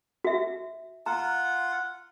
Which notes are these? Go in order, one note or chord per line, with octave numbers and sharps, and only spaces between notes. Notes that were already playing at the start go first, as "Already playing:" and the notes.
F#4 E5
F4 F#5 A#5